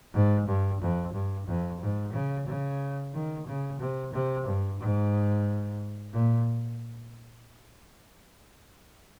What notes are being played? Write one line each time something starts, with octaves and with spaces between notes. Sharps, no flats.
G#2
G2
F2
G2
F2
G#2
C#3
C#3
D#3
C#3
C3
C3
G2
G#2
A#2